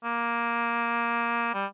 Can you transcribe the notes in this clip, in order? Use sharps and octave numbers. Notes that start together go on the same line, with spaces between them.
A#3
G3